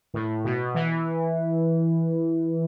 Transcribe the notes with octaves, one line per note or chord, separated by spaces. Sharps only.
A2
B2
E3